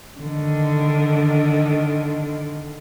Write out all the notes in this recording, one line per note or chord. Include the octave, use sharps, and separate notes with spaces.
D3 D#3